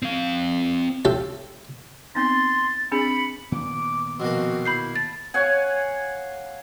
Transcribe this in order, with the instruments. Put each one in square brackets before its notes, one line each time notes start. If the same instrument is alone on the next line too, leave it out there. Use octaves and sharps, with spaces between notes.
[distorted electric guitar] C4 F5
[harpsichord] C#4 F4 G4 A4 E5 F5
[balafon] B3 C4 D#4 [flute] C6 [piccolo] A6
[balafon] C4 D4 G#4 [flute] B5 [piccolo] C#7
[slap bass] A#2 D#3 B3 [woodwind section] D6
[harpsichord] B2 A#3 [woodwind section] F3 C4 F#4
[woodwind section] E4 [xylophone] B5 G6 C7
[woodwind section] A5 B5 [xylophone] A6
[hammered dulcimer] C#5 F5 F#5 G#5